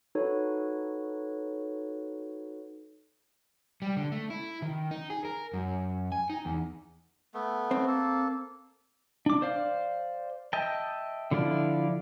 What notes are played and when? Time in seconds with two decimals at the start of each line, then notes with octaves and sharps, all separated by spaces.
0.15 D#4 F#4 A4 B4 C#5
3.82 G3
3.97 D3
4.12 A3
4.30 E4
4.62 D#3
4.91 D#4
5.10 G#4
5.25 A#4
5.53 F#2
6.12 G#5
6.30 D#4
6.45 E2
7.34 A3 B3
7.71 C4
7.87 A#3 A4
9.26 D4 D6
9.42 C5 D5 F5
10.53 D#5 E5 G5 A5
11.31 D3 F3 E4 F4 D5